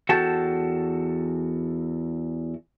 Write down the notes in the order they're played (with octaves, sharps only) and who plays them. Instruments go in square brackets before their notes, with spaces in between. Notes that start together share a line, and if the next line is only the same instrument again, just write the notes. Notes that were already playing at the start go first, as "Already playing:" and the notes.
[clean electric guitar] E2 F#4 A4 G5 A5